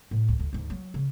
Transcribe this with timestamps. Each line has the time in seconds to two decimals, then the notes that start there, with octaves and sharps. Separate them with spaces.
0.11 A2
0.28 D2
0.39 D2
0.53 D2 G#2
0.70 F#3
0.94 C#3